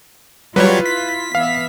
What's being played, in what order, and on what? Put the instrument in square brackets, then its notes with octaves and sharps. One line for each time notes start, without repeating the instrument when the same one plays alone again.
[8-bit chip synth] F#3 G3 C#5 [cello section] E4 F4 [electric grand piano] B4
[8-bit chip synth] B6
[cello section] E3 B3 E5 [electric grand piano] F5